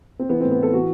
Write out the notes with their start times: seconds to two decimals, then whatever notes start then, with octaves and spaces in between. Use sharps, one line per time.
0.19 C4
0.29 E3 B3
0.41 A2 C4
0.51 B3
0.58 E3 A4
0.73 E3 F#4